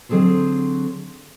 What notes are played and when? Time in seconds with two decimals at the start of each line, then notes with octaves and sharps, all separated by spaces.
0.09 D3 F#3 C4 G#4 A4 C5